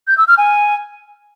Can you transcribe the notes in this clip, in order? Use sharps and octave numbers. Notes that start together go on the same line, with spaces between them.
G6
E6
F6
G#5